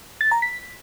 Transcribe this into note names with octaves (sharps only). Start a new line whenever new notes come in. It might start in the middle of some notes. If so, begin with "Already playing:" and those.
A6
A#5
B6